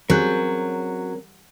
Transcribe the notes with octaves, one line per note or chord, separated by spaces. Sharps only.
F#3 C4 C#4 G#4 A#4 F#6 G6